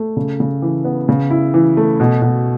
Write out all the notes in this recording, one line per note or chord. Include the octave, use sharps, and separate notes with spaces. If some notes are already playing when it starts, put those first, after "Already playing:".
Already playing: A3
C#3
C#3
E3
B3
C#3
E4
E3
A3
B2
B2